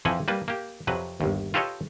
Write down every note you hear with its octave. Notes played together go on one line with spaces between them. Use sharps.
F2 E3 F3 C4 F#5 G#5
G3 A#3 B4
A#3 G4
F2 C3 F#3 B4
G1 D#2
F4 G4 A4 B4 C#5 D#5